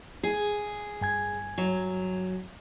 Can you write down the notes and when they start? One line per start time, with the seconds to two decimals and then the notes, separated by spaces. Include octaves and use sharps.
0.23 G#4
1.01 G2 G#5 G#6
1.58 F#3